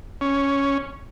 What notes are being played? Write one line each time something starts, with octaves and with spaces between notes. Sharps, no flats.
C#4